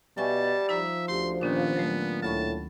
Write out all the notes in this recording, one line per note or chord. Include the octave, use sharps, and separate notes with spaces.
B2 G3 E5 G#5 A5 C#6
F3 D#4 E5 A#5
D2 G4 C6
A#2 D#3 B3 C#4 D4
A#2 F#3 A3
D2 A2 A5 B5 C#6